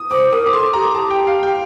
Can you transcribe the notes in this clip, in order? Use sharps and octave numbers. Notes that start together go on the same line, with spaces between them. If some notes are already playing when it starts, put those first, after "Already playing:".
Already playing: D#6
C5 D6
A#4 D#6
D6
A4 C6
G4 A#5
A5
G5
F5
G5